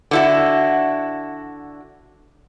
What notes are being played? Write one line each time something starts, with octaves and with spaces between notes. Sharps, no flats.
D3 E4 F#4